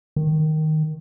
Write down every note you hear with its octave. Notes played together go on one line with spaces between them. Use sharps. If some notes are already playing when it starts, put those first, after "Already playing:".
D#3